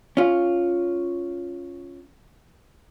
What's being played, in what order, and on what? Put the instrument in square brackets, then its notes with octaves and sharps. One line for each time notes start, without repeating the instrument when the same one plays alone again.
[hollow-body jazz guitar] C#4 F4